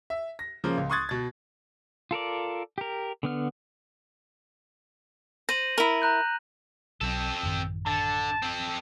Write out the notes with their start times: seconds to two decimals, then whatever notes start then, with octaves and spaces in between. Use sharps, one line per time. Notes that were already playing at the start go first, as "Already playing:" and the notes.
0.10 E5
0.39 A#6
0.64 C#3 F3 A#3
0.78 C#2
0.90 C6 C#6 D#6 F#6 G#6 A6
1.09 B2 A6
2.11 F4 A4 A#4 D5
2.78 G4 A#4
3.23 D3 B3 F6
5.49 C5 A#6 D#7 F#7
5.78 E4 A#4
6.02 A#5 F#6 G6
7.01 B1 F#3 C4 A4
7.43 A1 F#2 D#3
7.86 D3 A5
8.42 C4 A4